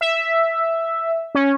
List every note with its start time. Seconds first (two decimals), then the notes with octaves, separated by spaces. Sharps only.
0.01 E5
1.35 C#4